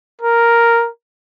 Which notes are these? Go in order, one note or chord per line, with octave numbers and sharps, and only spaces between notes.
A#4